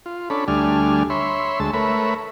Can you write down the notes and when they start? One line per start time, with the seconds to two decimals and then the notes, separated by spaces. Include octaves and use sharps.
0.06 F4
0.30 C#4 D4 A4 B5
0.48 D2 G3 A3 D4 G#5 F6
1.10 C#5 E5 B5 C6
1.60 D2 G#3 A5 E6
1.74 A3 A#4 B4 C#5 E5 B5